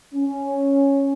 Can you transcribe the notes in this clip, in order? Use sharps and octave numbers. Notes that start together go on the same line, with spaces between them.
C#4